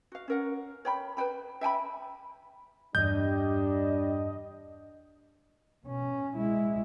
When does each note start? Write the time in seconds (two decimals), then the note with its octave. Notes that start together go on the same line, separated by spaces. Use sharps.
0.12 F#4 F5
0.28 C#4 A#4 F#5
0.85 C#5 G5 B5
1.17 B4 C5 G5 B5
1.61 E5 G5 G#5 B5
2.95 E2 G2 G3 D4 D#5 G6
5.84 B2 C#4
6.36 G#3 E4